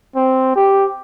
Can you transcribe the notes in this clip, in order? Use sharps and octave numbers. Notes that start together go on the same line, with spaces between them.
C4
G4